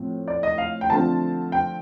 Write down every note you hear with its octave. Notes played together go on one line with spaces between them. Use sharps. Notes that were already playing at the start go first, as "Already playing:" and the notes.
Already playing: A2 F3 C4
D5
D#5
F5
G5
D3 F3 A3 C4 A5
G5